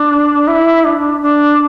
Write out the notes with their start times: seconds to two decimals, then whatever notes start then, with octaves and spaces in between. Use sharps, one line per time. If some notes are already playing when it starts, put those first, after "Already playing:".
Already playing: D4
0.48 E4
0.85 D4
1.22 D4